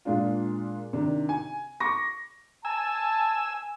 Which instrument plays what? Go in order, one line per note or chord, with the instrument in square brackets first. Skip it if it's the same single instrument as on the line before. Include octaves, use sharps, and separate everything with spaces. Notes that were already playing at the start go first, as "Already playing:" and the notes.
[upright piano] A#2 G#3 D4 F4
C3 D#3 D4
G#5
C#6 D6 A#6
[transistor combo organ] G#5 E6 [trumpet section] A5